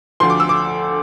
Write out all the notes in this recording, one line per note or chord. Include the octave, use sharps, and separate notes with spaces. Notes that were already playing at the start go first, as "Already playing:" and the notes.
D2 D3 F3 C6
D6
E6
D6